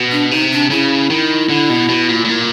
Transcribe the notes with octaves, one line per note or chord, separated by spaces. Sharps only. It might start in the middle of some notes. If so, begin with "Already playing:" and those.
Already playing: B2
D4
C3 D#4
D4
C#3 E4
D#3
D3
B2
B2
A#2
A2
A#2